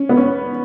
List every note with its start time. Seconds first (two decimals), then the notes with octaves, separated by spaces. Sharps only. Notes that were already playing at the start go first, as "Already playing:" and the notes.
Already playing: C#4
0.09 B3
0.17 C#4